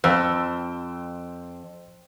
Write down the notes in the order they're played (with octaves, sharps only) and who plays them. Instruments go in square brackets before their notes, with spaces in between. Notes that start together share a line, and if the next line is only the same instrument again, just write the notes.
[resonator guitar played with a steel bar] F2 [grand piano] C5 G5 E6